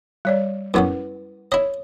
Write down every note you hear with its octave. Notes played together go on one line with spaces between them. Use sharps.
G3 C#5 D5
F#2 B3 C#4 E4 B4
E4 C#5 D#5